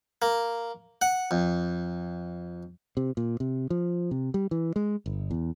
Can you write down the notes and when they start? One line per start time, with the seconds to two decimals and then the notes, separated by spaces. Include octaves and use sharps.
0.22 A#3
1.02 F#5
1.31 F2
2.97 C3
3.17 A#2
3.40 C3
3.70 F3
4.11 C3
4.34 G3
4.51 E3
4.76 G#3
5.06 G1
5.31 E2